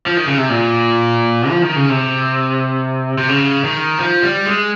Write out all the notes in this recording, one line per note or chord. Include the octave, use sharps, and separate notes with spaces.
F3
D#3
C#3
C3
A#2
F3
D#3
C#3
C3
C3
C#3
D#3
F3
G3
G#3